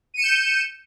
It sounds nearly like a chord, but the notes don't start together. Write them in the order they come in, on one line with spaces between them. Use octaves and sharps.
D#7 C#7 E7 G6